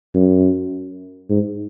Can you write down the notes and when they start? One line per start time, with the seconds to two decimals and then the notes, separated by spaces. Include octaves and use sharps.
0.15 F#2
1.30 G#2